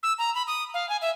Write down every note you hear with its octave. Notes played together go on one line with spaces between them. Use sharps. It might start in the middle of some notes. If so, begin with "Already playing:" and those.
E6
A#5
B5
D#6
F5
G#5
E5